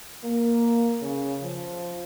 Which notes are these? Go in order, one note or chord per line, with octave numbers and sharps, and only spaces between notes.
A#3
C#3
F3